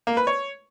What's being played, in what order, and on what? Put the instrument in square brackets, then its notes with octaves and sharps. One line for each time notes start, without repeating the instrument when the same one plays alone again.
[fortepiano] A#3
B4
C#5